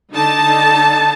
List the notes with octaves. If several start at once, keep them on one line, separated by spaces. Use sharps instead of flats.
D3 D#4 A5